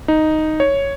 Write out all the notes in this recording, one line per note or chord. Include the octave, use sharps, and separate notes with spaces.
D#4
C#5